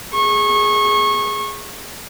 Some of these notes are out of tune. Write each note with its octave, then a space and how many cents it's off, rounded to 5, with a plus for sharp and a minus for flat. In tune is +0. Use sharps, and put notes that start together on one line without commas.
G#4 +0 C#6 -25